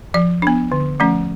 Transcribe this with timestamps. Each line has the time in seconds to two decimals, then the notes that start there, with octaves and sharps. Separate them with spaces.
0.14 F3 D5
0.42 B3 D4
0.72 D3
1.00 F3 A3 C#4